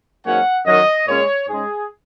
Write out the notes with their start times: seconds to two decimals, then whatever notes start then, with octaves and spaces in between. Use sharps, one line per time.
0.24 G#2 F#3 A#3 C#4 F#5
0.65 F#2 D#3 F#3 D#5
1.07 A#2 G#3 C#4 C#5
1.47 G#2 G#3 C#4 G#4